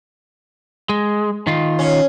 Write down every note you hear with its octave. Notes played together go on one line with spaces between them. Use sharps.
G#3
D#3 F4
C#4